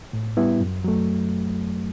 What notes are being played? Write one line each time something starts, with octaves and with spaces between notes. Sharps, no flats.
A2
G3 B3 E4
F#2
F#3 A3